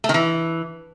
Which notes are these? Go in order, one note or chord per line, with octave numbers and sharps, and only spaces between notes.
A3
D#3
E3